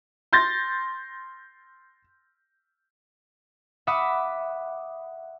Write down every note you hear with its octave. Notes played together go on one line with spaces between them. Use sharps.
C6 G6 A6 A#6
E5 F#5 B5 D6 D#6